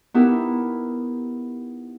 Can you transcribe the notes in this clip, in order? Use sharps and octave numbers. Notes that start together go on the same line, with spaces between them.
B3 D#4 E4 G4 A#4